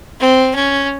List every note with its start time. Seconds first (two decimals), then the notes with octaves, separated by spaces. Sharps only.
0.20 C4
0.55 C#4